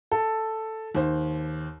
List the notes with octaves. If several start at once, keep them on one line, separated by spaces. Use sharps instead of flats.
A4
D#2 C5